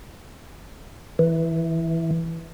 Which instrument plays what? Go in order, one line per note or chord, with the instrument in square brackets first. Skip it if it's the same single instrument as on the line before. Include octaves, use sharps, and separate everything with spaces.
[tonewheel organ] E3